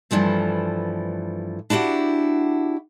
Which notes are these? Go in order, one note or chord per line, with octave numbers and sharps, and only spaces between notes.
G2 E3 F3 A3
D4 E4 F#4 G4 F#5